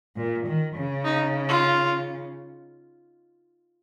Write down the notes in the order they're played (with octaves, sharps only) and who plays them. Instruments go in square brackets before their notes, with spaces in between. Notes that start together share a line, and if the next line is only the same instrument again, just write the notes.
[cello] A#2
D#3
C#3
[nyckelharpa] D#4
F4